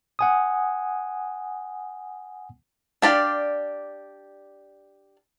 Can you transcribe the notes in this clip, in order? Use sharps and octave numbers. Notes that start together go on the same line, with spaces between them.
F#5 G#5 D#6
D4 G4 D5 F5